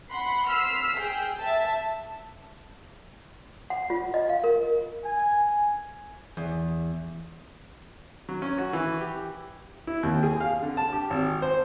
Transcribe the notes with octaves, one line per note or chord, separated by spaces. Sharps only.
F#5 B5 C6
E6 F6 B6 C7
G#4 G5
E5 A5
F#5
F4
D#5
F5
A#4
G#5
E2
F#3
C#4
F#4
E3
G4
E4
D#2
G#4
F5
D3
A5
G4
G#1
C5